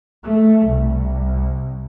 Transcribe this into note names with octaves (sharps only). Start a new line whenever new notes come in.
A3
C2